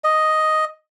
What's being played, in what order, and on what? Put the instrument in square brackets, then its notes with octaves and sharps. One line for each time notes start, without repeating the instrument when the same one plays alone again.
[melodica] D#5